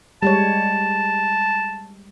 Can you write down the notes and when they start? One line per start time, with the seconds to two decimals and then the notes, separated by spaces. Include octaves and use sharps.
0.23 G3 G#3 C#5 A5